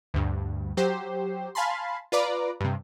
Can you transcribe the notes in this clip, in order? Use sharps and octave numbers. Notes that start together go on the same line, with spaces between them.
D2 G2
F#3 G4 C5
F5 G#5 A5 B5 C6
F4 B4 D5 A#5 D6
G2 C3